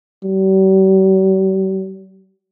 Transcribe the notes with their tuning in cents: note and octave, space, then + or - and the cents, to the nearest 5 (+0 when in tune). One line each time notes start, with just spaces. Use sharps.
G3 -45